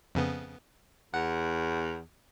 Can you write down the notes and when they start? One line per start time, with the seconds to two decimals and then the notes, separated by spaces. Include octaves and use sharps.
0.15 F2 C#3 B3
1.14 E2 F#5